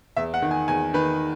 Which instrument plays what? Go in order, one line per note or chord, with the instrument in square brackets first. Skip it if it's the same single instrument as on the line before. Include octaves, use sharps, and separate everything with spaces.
[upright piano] E2 E5
F#5
D#3
G#5
E2 G#5
D#3 B4